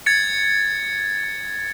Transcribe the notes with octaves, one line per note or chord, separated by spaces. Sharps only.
G#6 A6 C#7